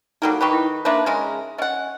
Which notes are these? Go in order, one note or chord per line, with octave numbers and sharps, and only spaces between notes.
F#3 G3 A#3 D#4 A4
D#3 G4 B4 B5 C#6
E4 G5
A#3 D4 B4 C5 E5 C6
C#3 G#3 A#4
C#4 D#5 F#5 G#5